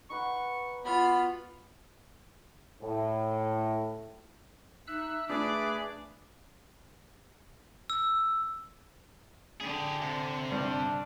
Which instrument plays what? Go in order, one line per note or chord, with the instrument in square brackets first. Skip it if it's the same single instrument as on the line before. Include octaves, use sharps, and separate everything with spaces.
[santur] D#4 B4 F#5 [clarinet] C#6
[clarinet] B3 [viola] F4 [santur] F#4 [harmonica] B5
[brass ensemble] A2
[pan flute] D#4 [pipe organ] E5 E6 F#6
[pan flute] A3 [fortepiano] D4 [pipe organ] G#4 B4 [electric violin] D5
[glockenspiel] E6
[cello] D3 [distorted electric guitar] G4 G#4
[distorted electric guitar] C3
[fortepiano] G2 [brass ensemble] D4